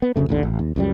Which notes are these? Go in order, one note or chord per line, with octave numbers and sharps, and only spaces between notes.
B3
F#1 D2 C#3 A3
A1 D#2 D3
A1
D#2
C#2 F#2 G3